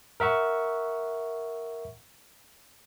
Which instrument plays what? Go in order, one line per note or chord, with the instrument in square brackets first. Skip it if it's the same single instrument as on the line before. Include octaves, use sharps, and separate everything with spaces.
[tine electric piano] A#4 E5 F#5 C#6